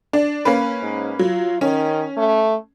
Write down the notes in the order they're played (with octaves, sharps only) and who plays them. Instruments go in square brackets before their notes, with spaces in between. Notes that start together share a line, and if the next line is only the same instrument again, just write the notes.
[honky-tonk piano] D4
A#3 C#4 B4
[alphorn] G#2
[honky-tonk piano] F#3 [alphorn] F4
[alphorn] D#3 [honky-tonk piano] C#4
[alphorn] A3